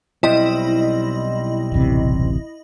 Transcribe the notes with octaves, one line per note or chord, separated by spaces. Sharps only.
B1 G3 C4 E4 D#5
D1 A1 C3